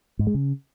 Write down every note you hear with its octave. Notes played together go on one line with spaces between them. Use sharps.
G#2
G#3
C#3